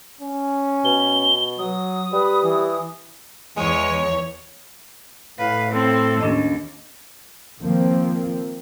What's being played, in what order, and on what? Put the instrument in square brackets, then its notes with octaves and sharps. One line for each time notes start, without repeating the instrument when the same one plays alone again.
[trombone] C#4
[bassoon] B2 [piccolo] G7
[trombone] F#3 [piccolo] D#6
[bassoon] G3 [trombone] B4
[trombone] E3
[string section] E2 C#5 [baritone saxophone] G#3
[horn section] A2 [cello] B4 [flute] F5
[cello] C4 [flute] A4
[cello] D#2 [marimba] C#4 D4 D#5
[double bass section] D#3 F3 A#3 C4